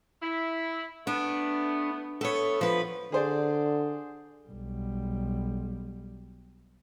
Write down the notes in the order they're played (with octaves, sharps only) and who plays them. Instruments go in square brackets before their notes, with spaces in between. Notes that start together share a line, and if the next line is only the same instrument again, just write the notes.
[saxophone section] E4
[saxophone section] A3 B3 [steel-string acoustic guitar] D4
[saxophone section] A3 B3 [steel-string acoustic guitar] A4 C#5
[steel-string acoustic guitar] F3 B4
[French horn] D3 [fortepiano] G#4 C5 D5
[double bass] B1 G3